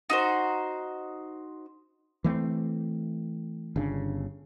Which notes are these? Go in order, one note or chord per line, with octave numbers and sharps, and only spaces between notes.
D#4 F#4 C5
E3 A3 A#3 C4
G1 C#3 D4